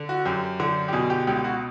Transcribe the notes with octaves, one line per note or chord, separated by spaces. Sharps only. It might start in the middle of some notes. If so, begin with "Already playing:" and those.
Already playing: D3
F#4
F#2 G4
D3
G4
B2 G#4
G4
C#2 G4
F#4